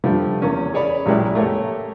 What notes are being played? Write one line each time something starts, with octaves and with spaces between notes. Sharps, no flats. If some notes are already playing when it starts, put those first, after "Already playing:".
D3 F3 G3 A3
E2 A#3 C#4
G#4 C#5 D5 B5
A1 A#2 F#3 G#3 E4 G4
A3 A#3 G4 C#5